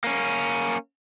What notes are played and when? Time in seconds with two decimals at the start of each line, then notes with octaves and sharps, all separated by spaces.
0.04 A#3 C#4